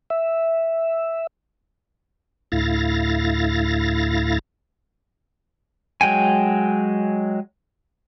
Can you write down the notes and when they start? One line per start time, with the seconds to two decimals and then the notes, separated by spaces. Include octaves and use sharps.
0.10 E5
2.52 D2 A2 E4 F5 A6 A#6
6.01 F#3 G#3 G5 G#5